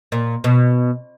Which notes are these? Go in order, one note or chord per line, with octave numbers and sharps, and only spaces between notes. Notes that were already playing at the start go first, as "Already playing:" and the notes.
A#2
B2